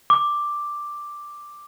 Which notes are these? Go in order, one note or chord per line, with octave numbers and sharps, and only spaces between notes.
D6